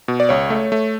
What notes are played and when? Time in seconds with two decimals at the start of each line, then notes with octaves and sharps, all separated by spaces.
0.08 B2
0.20 D5
0.29 C#2 C#5
0.50 A3
0.72 A3